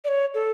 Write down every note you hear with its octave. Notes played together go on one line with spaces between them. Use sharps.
D5
C#5
A4